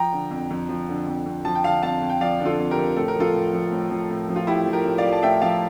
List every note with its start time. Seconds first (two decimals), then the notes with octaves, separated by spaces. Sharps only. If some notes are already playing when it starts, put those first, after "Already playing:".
Already playing: F3 G5 A#5
0.13 D3
0.31 F2
0.51 F2
0.69 F3
0.88 D3
1.07 F2
1.26 F2
1.45 F3 A5
1.55 G5
1.64 D3 F5 A5
1.83 F2 F5 A5
2.02 F2
2.10 G5
2.21 F3 D5 F5
2.40 D3
2.45 F4 A4
2.59 F2
2.71 G4 A#4
2.77 F2
2.97 A2 A4
3.08 A#4
3.15 F3 F4 A4
3.34 A2
3.53 F3
3.72 A2
3.90 F3
4.10 A2
4.29 F3
4.36 F4
4.47 A2 E4 G4
4.67 F3
4.73 G4 A#4
4.85 A2
4.98 D5 F5
5.04 F3
5.12 A5
5.23 A2 E5 G5
5.42 F3 F5 A5